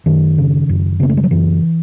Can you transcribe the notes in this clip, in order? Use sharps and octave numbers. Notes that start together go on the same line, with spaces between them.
F#2 D#3
C#3
F#2
C#3 B3
A3
G#3
F#3
F#2 E3